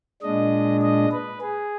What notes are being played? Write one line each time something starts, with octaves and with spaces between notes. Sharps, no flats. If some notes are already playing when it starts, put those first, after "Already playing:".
A#2 G#3 D4 D#5
D#5
B4
G#4